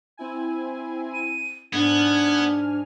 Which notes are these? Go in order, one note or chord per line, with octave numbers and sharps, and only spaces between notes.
C4 E4 G#5
D#7
G#2 B3 D4 G#5 F6 G#6